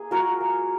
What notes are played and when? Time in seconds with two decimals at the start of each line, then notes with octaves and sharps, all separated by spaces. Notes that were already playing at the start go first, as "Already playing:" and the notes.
Already playing: A#3 G#4
0.11 F4 F#4 A#4
0.40 A#3